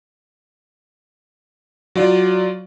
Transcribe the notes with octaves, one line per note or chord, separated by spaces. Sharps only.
F#3 F4 D5